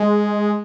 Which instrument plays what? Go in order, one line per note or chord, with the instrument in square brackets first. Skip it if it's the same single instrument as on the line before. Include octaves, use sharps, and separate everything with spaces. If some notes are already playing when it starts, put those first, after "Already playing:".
Already playing: [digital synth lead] G#3